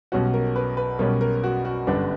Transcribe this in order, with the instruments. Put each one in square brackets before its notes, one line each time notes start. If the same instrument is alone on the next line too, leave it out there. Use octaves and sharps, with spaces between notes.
[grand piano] B1 B2 G3 C#4 F#4
A#4
B4
B4
B1 B2 G3 C#4 A#4
A#4
F#4
F#4
G1 F#2 D3 G3 B3 D4